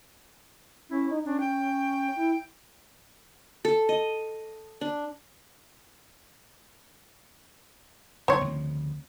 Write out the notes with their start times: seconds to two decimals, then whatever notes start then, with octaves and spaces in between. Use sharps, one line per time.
0.90 C#4 E4
1.10 D#4
1.25 C#4 D4
1.40 G5
2.16 E4
3.65 A4
3.89 D#5
4.81 D4
8.28 F#1 C4 C#5
8.44 D2 C#3 F3